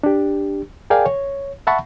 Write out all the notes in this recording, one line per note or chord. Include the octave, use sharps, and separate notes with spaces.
D4 G4
G#4 A#4 D5 F5 G5 G#5
C#5
E5 F#5 A5 B5 C#6